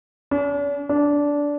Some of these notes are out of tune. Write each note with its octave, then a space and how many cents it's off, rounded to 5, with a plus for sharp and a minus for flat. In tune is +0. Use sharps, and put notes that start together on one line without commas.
D4 -45
D4 -15